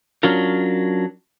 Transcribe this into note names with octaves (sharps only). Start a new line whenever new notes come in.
F#3 C#4 D4 F4 A#4